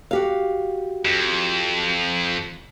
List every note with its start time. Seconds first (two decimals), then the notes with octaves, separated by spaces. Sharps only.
0.11 F#4 G4 F5
1.05 F2